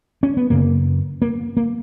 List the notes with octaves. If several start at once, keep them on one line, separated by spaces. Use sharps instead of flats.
C#4
B3
F#2 C#3 A#3
A#3
A#3